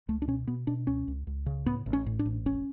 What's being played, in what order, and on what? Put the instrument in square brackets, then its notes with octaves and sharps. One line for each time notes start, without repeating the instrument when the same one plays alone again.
[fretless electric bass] C#2 A3
D4
B2 C#4
B2 B3
B2 D4
C#2 C#4
C#2
C#2
C#3
A2 B3
A1
C#4
A2
D4
A1
F1 C#4